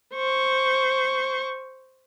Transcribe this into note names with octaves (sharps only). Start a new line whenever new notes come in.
C5 C#6